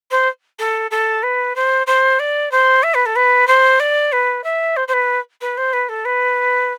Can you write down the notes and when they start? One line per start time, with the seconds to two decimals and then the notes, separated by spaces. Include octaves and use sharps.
0.11 C5
0.59 A4
0.91 A4
1.23 B4
1.56 C5
1.87 C5
2.19 D5
2.51 C5
2.83 E5
2.94 B4
3.06 A4
3.16 B4
3.47 C5
3.80 D5
4.12 B4
4.44 E5
4.76 C5
4.88 C5
4.93 B4
5.41 B4
5.57 C5
5.73 B4
5.89 A4
6.05 B4